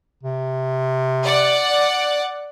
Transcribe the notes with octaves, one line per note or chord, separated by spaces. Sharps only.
C3
D5 F#5